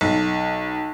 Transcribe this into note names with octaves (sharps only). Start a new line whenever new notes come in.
B1